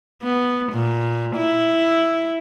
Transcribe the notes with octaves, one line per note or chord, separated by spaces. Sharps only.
B3
A#2
E4